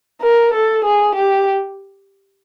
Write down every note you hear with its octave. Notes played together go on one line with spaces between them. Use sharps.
A#4
A4
G#4
G4